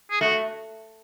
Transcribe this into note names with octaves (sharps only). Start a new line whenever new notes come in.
G#4
A3 F#4